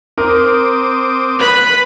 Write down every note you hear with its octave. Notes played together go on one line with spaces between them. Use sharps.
C4 A#4 D6 D#6
B4 B5